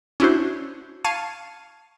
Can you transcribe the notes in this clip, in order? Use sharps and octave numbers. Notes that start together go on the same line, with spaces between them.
C#4 D4 E4 F#4 C5
F5 A5 C#6 G#6 D#7